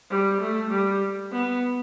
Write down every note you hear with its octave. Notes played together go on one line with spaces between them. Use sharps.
G3
A3
G3
B3